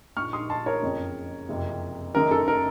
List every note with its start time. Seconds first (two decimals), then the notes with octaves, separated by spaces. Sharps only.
0.17 A#1 A#2 C#6 F6
0.33 C6 D#6
0.50 A5 C6
0.66 A#4 C#5
0.83 F#1 F2 C#3
1.49 F#1 F2 C3
2.14 F#1 F#2 D#3 A#4
2.31 A4
2.48 A#4